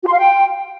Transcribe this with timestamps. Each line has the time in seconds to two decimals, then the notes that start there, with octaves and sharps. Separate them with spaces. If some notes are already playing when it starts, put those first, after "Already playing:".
0.03 F#4
0.08 C6
0.13 F5
0.18 G5